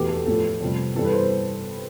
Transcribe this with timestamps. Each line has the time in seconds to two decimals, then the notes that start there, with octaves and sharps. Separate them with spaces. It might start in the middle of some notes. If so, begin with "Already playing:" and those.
Already playing: E2 B2 A3 G4
0.09 A4
0.26 A2 F3 A3 A4
0.61 F2 C3 G3
0.95 G2 E3 G3 A4
1.05 B4
1.13 C5